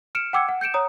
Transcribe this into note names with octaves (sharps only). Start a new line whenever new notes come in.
F6 C#7 D7 E7
F#5 G5 D6 E6 G#6 C#7
F#5
G6 C#7 D7 E7
C#5 A#5 D#6